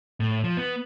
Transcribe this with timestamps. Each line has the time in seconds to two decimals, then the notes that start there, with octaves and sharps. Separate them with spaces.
0.20 A2
0.44 F3
0.57 B3